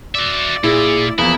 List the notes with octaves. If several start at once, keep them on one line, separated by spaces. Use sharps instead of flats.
F#4 D5 E5
A#2 E4 G#4
E2 F3 A#3 E4 G#4 B5